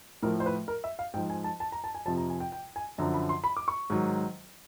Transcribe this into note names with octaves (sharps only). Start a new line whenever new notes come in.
A2 F3 A#4
C5
B4
A#4
E5
F5
G#2 F3 G5
G#5
A5
A5
A#5
A5
G#5
F2 C3 F3 A5
A#5
G#5
G5
G5
G#5
F#2 D3 F3 A#5
B5
C6
B5
D6
C#6
G#2 D#3 F#3